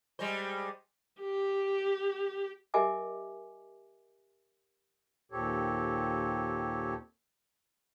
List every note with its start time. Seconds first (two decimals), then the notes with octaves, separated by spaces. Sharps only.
0.19 G3 G#3 C5
1.21 G4
2.74 G4 A#4 D#5 E5 G#5 D6
5.32 D#2 A#2 C4 G4 A4 C#5